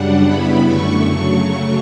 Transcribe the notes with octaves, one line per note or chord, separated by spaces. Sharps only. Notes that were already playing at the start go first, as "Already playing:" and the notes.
Already playing: F#2 C#3 G3 D4 F#5
C#3 G3 B3 E4 B5
F#2 D3 A3 C#6
C#3 F#3 A3